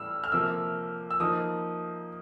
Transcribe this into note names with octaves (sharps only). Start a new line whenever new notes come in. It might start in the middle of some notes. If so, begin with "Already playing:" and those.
Already playing: A2 E3 G3 E6 F6
F6
C3 F3 A#3 E6
E6
F3 A#3 D#4 D#6